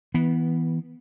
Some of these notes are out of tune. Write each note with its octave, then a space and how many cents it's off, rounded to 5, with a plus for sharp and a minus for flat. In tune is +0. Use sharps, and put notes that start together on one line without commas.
E3 -20 B3 +0